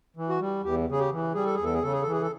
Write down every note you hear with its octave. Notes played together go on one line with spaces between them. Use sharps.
E3
F#4
G3
E2 G4
C#3 G#4
G4
E3
G3 G#4
A4
E2 G#4
A4
G#4
C#3 A4
G#4
E3 A4
G#4
A4